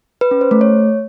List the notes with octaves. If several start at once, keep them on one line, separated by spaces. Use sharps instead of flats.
B4
C#4
C5
A3
C#5